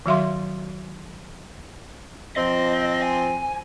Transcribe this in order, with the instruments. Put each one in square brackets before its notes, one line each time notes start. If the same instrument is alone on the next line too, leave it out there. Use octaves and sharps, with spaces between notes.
[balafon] D#3 F#3 F#4 E5 F5 C6
[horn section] F3 C4 [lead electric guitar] D#5
[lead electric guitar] G#5